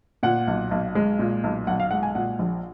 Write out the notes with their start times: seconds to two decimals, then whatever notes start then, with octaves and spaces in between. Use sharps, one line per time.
0.23 A#2 F#5
0.47 B1
0.71 B1
0.95 G#3
1.19 A#2
1.44 B1
1.67 B1 F#5
1.80 F5
1.91 G#3 F#5
2.03 G#5
2.15 A#2 F#5
2.39 A#1